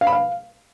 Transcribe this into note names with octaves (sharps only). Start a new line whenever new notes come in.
F5
B5
F5